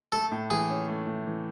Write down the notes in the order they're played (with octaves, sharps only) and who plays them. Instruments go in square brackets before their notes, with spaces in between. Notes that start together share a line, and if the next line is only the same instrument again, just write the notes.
[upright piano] A3 [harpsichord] A4
[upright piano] A2
[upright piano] E3 [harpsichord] G#4
[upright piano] C#4
A3
A2
E3